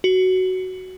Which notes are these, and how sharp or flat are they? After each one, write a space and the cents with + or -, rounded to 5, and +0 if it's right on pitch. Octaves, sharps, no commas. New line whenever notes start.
F#4 +10